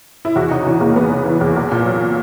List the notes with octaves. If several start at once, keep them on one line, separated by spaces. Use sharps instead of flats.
E4
E2 F#4
C#3 D#4
E3 C#4
E2 A#3
E2 B3
C#3
E3
E2
B1
A#2
F#3